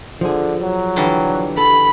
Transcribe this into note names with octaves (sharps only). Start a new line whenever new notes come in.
D3 F3 G#4
F#3
D3 E3 G3
A4 B5